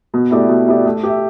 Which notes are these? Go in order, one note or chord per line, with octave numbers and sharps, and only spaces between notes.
B2
A3 E4 G4 D5
B2
A3 E4 G4 D5
A3
G4 E5